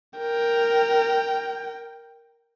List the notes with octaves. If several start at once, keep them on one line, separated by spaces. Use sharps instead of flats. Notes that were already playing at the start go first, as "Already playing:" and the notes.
A#4 G5